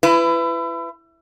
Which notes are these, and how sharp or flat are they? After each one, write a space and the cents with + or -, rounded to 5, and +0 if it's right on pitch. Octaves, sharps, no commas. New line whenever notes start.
E4 +30 B4 +20